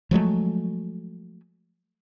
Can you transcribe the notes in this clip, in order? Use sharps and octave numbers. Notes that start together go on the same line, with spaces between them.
F3 F#3 G#3 A3